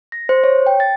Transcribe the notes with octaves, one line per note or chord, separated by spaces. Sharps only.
A#6
C5
C#5
G5
A6